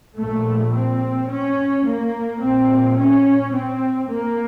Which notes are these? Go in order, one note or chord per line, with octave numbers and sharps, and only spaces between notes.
A#1 A#2 A3
C4
C#4
A#3
A#1 A#2 C4
C#4
C4
A#3